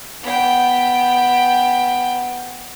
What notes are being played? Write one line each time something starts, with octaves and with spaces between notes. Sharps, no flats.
B3 G5